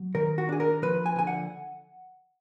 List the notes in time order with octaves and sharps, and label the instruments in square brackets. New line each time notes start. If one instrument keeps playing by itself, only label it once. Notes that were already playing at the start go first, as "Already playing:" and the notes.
Already playing: [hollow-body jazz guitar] F#3
D#3 A#4
F#4
D4 G#4
A#4
F3 B4
G#5
D3 G#5
F#5